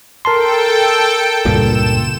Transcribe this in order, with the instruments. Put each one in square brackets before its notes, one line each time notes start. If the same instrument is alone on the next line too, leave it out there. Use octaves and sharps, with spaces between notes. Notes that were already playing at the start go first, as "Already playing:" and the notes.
[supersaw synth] A4 G5 [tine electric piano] A#4 A5 C6
[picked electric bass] C#2 G2 A#2 [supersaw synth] E7